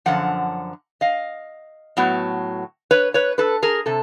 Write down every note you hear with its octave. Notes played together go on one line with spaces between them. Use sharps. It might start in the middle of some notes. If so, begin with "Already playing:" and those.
F#2 D3 F3 F#5
D#5 F5
A2 F#3 B3
B4 C#5
B4 C#5
A4 B4
G#4 A#4
C3 A4